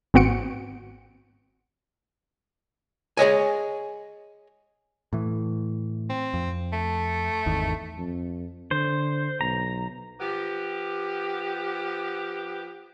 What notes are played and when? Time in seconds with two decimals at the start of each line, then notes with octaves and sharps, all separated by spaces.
0.14 G#1 B3 C4 F#4 C#7 D7
3.17 G#4 C#5 D#5 G#5
5.13 A2 E3
6.10 C4
6.34 F2
6.73 A3
7.46 G#1 E2 D#3
7.97 F2
8.71 D3 C5
9.41 B1 A#5
10.20 F3 B3 G4